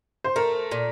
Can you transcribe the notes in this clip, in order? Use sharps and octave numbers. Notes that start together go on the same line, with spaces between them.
C5
A3 A#4
A#2